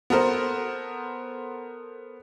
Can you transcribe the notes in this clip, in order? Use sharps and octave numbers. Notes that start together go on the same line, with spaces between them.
B3 A4 A#4 C5